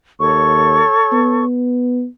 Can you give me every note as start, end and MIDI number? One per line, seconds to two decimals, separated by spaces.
0.20 0.82 39
0.20 1.44 69
0.20 1.44 73
0.20 1.44 85
1.13 2.07 59